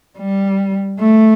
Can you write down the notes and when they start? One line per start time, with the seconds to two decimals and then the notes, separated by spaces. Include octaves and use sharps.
0.18 G3
0.99 A3